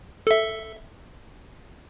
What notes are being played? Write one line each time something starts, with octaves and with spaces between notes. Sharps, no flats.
A4 E5